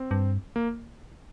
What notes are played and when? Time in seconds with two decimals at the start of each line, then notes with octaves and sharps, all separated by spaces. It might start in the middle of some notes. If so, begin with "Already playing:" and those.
Already playing: C4
0.11 G2
0.56 A#3